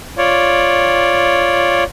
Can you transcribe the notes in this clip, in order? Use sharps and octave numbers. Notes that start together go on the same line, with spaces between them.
F4 C#5 D5